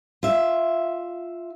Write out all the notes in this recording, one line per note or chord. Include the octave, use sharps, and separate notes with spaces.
F4 E5